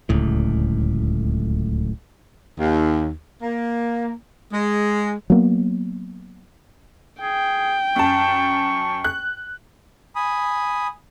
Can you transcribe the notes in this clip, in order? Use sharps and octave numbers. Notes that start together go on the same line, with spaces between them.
D1 C#2 A2
D#2
A#3
G#3
F#3 A#3 B3
G#4 G5
F#2 A5 C#6
F#6
G#5 B5 D#6